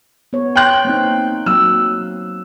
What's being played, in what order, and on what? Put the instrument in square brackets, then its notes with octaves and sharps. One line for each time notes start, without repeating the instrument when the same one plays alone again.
[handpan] B3 C#5
[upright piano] G5 C6 F#6
[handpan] A#3 C4 D#4
[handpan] F#3 A#3 [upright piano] E6